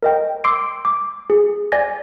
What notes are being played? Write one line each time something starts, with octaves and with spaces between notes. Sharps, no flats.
A#4 D#5 G5
C6 D6 E6 C7 D7
D6
G#4
D5 G#5 G#6 A#6